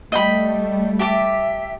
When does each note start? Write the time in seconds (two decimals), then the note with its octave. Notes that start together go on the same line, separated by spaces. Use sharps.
0.12 G3 A3 D#5 G5 B5
0.99 G4 E5 A5 D6